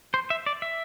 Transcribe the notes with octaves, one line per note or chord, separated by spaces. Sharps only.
C5
E5
D5
E5